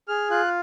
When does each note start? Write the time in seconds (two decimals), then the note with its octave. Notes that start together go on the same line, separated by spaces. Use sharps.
0.08 G#4 F6
0.30 F4 F#6